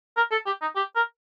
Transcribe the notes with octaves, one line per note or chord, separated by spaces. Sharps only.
A#4
A4
G4
D#4
G4
A#4